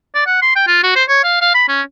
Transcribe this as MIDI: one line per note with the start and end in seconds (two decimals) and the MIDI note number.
0.15 0.23 74
0.27 0.41 78
0.42 0.55 84
0.56 0.64 79
0.67 0.80 65
0.83 0.93 66
0.96 1.04 72
1.09 1.24 73
1.24 1.40 77
1.41 1.51 77
1.55 1.66 83
1.68 1.82 61